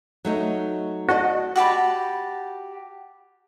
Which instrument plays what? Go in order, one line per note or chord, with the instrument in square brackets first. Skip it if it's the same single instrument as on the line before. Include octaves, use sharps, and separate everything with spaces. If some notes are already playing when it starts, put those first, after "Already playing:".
[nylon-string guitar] F#3 A3 D#4
[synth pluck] F#4 [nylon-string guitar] D5 D#5 A5
[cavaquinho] F#4 G4 A5 B5